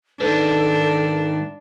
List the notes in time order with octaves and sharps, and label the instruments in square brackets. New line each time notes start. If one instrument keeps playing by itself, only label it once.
[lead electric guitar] G#2 D#3 [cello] D4 [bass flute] A4 [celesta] B4